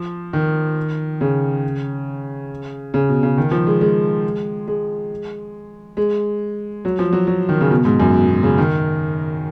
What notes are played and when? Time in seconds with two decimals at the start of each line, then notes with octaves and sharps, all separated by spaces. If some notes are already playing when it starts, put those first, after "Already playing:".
Already playing: F3
0.33 D#3
1.21 C#3
2.94 C#3
3.09 B2
3.23 C#3
3.38 D#3
3.51 F3
3.67 G#3
3.81 G#3
4.67 G#3
5.97 G#3
6.85 F#3
6.99 F3
7.13 F#3
7.27 F#3
7.49 D#3
7.61 C#3
7.71 B2
7.85 G#2
8.00 F#2
8.14 B2
8.28 B2
8.43 C#3
8.58 D#3